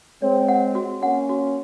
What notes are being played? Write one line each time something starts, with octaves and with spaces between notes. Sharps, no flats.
G#3 C4 C#5
F#5
F#4
A#3 C#4 F#5
F#4